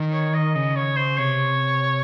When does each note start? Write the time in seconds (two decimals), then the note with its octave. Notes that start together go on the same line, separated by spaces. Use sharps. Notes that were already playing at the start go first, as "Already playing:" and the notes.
Already playing: D#3
0.12 C#5
0.34 D#5
0.55 C#3 D#5
0.76 C#5
0.97 C5
1.18 C3 C#5